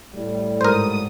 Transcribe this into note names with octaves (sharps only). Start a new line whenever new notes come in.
A2 G3
G#2 A#4 C5 D#6